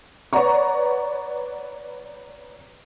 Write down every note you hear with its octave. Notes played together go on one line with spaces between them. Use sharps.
B4 C#5 D5 F#5 A#5 C#6